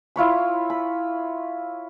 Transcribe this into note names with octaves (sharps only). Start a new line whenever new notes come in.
E4 F4 C#5 B5
B5